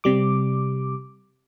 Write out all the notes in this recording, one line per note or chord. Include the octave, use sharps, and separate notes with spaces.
C3 G3 D6